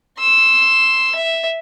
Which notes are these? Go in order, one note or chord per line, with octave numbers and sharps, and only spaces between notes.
C6 E6
E5